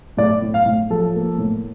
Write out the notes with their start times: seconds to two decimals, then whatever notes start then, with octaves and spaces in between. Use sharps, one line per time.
0.17 A2 D5
0.42 A2
0.54 F5
0.66 A2
0.90 F3 A4
1.15 A#3
1.38 A2